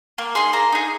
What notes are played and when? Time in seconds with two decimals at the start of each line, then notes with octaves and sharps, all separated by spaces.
0.18 A#3
0.35 D#4 G#4 C6
0.53 A#3 A#5
0.72 D#4 G#4